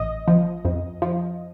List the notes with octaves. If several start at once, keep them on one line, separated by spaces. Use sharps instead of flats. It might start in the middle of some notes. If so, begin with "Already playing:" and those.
Already playing: A1 D#5
F3
F2
F3